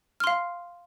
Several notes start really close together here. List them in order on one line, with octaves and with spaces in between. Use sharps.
F6 C6 F5